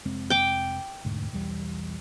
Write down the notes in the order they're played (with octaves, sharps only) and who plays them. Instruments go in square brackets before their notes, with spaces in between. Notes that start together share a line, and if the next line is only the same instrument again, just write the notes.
[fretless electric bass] F1 G#3 C4
[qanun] G5 D6
[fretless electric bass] E1 D2 G#2
B1 E2 G3